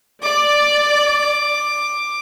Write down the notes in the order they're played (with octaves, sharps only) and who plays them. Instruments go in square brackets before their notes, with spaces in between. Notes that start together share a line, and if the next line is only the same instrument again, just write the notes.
[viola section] D5 [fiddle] D6